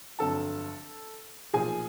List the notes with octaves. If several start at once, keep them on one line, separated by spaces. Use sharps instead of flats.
G1 F2 D3 F#3 A4 A5
B1 A#2 F3 G#4 G#5